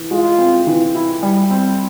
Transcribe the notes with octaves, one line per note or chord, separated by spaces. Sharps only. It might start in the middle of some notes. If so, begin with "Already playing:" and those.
Already playing: E3
G#3 F4
C4
E3
E4
G3
C4